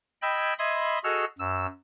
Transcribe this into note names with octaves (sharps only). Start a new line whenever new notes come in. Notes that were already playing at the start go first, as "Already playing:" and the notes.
D#5 G5 B5 E6 G#6
D#5 E5 B5 C6 D#6 G#6
F#4 G#4 A4 D#5 E6 F6
F#2 E6